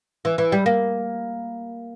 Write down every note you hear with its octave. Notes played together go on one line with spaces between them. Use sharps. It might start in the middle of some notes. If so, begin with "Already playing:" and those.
E3
E3
G3
A#3